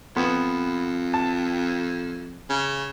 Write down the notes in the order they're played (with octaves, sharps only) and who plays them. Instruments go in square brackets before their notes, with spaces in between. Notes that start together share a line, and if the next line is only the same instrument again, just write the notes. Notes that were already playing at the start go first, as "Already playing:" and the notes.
[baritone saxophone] F2 [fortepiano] B3
[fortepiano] A5
[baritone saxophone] C#3